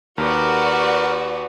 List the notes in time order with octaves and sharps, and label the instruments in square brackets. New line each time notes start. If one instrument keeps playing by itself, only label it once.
[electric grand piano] D#2 [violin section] F#4 D5 [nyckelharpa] G4 B4 [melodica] A#4